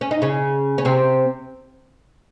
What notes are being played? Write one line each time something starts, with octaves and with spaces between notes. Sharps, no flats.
C#4
D#4
C#3 C#4
C#4
C3 C4